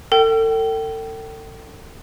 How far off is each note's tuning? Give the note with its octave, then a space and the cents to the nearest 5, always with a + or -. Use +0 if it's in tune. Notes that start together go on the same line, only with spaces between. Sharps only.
A4 +35 G5 -25